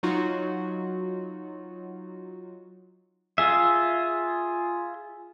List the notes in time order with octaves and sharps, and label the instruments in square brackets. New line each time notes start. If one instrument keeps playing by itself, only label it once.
[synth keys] F#3 D#4 F4 F#4
[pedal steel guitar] F4 G#4 E5